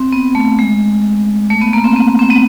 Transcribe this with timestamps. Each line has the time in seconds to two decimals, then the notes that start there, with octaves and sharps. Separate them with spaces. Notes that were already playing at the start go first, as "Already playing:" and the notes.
Already playing: C4
0.12 B3
0.35 A3
0.59 G#3
1.50 A3
1.61 B3
1.73 A#3
1.84 C4
1.96 B3
2.19 C4
2.30 B3